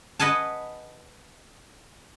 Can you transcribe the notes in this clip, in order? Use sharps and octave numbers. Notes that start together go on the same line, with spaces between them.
B4 D#5 F#5 G#5 A5